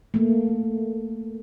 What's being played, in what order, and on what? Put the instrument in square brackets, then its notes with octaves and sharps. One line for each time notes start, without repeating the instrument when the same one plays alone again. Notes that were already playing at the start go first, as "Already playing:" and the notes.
[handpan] A3 A#3